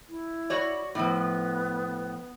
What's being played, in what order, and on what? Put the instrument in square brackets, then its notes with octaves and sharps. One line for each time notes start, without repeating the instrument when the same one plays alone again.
[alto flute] E4
[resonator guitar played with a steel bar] F#4 C#5 D5
[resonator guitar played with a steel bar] A2 F3 [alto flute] B3